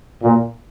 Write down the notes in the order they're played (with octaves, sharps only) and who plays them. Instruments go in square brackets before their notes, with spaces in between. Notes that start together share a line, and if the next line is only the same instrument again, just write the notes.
[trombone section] A#2